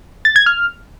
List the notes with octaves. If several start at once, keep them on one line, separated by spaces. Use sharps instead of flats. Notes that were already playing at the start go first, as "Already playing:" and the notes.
A6
G#6
F6